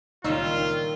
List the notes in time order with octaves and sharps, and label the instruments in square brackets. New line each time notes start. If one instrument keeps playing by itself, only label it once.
[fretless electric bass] C#2 [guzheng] A#2 D#3 G3 [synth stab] D#4 C#5 E6 [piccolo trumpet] F4